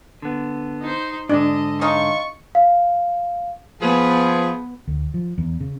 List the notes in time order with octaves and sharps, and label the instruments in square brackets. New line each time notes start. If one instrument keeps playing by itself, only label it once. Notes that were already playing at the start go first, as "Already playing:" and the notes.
[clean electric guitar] D3 B3
[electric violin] D#4 C5
[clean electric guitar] G#2 D3 [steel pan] D4 [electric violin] D#5
[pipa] C#4 D#4 F4 [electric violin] C#6
[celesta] F5
[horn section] F3 G#4 [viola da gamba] B3 B4
[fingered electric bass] D2
F3
E2
C#3